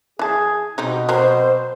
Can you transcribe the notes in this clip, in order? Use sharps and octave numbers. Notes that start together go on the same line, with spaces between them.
E3 G#4 A5
B2 G3 C4 D#4
F#3 C4 A#4 C5